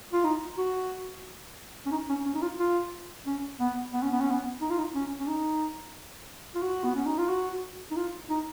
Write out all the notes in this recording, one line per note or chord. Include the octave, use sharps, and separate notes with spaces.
F4
D#4
F#4
C#4
D#4
C#4
C#4
D#4
F4
F4
C#4
B3
B3
C#4
B3
C#4
B3
D#4
F4
D#4
C#4
C#4
D#4
F4
F#4
B3
C#4
D#4
F4
F#4
D#4
F4
D#4